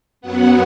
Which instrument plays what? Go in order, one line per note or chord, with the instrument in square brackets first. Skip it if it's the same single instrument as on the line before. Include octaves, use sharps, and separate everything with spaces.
[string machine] F#2 F#3 B3 F#5